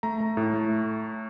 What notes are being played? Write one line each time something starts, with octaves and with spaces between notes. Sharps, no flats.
A3 A#5
A3
A2
A3